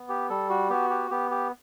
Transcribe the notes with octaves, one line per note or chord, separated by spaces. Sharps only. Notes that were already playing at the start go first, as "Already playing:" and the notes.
Already playing: B3
G4
G3 A4
F#4
B3 F#4 G4
G4
B3 G4
G4